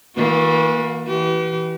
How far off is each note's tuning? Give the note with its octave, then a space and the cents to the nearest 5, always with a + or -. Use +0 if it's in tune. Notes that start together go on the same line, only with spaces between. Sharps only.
E3 -30 A#3 +0 F#4 -30
E3 -10 G4 -40